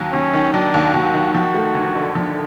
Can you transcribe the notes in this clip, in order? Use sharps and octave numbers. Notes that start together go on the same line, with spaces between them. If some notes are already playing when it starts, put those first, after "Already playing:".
Already playing: D#2 F#3
D#2 C#4
D#3
F#3 D4
D#2
D#2 F#4
D#3
F3 F#4
A3
D2
D3
F3